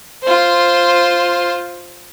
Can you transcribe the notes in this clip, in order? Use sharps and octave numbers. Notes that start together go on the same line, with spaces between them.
F4 C5